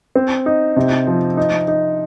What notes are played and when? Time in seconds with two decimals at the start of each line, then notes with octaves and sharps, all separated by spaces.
0.15 C4
0.46 D#4
0.76 C3
1.07 F3
1.37 D#4
1.68 D#4